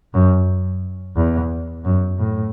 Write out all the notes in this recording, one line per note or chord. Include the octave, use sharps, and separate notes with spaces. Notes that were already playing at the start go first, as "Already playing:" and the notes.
F#2
E2
F#2
A2